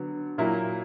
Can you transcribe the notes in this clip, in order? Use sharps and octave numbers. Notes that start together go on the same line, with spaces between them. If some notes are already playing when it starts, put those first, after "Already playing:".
Already playing: D3 F#3 B3
A#2 F#3 A#3 E4